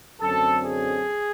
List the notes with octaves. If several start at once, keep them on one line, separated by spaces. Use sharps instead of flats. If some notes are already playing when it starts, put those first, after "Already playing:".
F#2 D3 F#3 A3 C4 A4
G#4